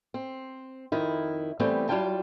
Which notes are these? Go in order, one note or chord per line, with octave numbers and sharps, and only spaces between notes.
C4
F2 D#3 E4
E3 G3 A3 B3 C4
F#3 G3 E4 F4 G5 A5